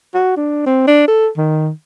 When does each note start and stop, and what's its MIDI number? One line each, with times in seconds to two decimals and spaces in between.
0.14 0.36 66
0.37 0.63 62
0.66 0.83 60
0.87 1.05 62
1.08 1.28 69
1.37 1.69 51